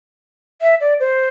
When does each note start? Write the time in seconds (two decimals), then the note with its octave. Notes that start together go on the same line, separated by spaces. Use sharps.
0.62 E5
0.81 D5
1.00 C5